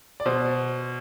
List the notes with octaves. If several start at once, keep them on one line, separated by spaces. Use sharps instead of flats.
D5
B2 C5